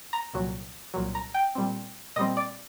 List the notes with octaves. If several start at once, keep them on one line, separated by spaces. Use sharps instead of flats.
A#5
C2 A#2 F#3
C2 A#2 F#3
A#5
G5
A#2 G3 C4
A#2 G3 C4 D#5
D5